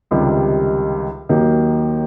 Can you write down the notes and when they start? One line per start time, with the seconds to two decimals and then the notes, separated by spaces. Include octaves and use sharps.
0.11 C#2 C3 D#3 G3
1.29 D#2 D#3 F#3 A#3